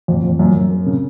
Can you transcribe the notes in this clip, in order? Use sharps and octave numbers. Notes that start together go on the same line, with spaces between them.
F2
F2
F#2
F#2
A#3
C#3